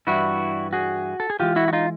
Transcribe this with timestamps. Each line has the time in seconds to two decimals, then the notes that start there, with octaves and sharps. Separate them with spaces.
0.07 G2 E3 G3 E4 F#4
0.73 F#4 G#4
1.20 A4
1.30 G#4
1.39 A2 E3 G#3 F4 G4
1.56 E4 F#4
1.68 F#4
1.73 D#4 F4